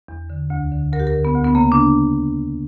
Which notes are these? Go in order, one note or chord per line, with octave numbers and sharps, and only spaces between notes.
E2
D3
D2
D3
D2 A#4
G4
A#4
D3
B3
D2
B3
C#3 A#3
D4